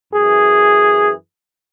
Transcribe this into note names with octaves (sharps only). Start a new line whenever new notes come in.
F#2 E3 G#4